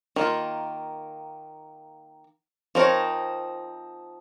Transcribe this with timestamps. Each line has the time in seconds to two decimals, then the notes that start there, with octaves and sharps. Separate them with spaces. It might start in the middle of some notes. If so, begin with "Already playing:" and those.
0.16 D#3 A#3 F4
2.75 F3 C4 D#4 A#4 C#5